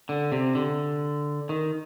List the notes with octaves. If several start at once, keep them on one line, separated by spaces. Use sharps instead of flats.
D3
C3
D3
D#3